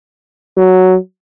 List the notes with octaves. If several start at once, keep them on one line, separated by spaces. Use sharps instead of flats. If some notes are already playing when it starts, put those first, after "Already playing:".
F#3